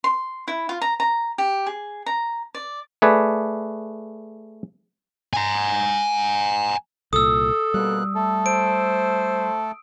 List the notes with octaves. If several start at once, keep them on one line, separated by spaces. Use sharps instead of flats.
C6
E4
F4
A#5
A#5
G4
G#4
A#5
D5
A3 G#4 B4 D5
G#5 A#5
C2 A#2 A4 D#6 E6
B2 G3 A#3 F#6
A3 A4
C5 D7